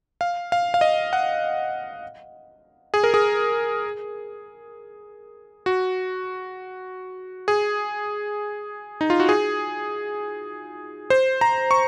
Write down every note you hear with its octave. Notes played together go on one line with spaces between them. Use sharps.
F5
F5
F5
D#5
F#5
G#4
A#4
G#4
F#4
G#4
D#4
F4
F#4
G#4
C5
A#5
C#6